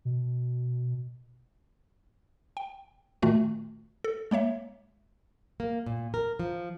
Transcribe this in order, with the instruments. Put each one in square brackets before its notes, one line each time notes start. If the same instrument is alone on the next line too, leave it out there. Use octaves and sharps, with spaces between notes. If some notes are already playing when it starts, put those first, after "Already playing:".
[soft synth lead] B2
[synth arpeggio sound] G5
A#2 D#3 A3 F4 F#4
A4
G#3 A#3 C#5 E5
[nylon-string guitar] A#3
A#2
A#4
F3